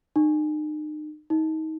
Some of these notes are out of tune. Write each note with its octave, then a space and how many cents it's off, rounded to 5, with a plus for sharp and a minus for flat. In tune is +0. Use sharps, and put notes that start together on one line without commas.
D#4 -35
D#4 +25